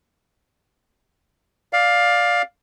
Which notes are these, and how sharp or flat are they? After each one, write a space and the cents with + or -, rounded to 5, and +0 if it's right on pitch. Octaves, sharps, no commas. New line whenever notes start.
D5 +0 F5 +15